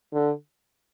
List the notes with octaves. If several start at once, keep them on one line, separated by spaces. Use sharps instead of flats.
D3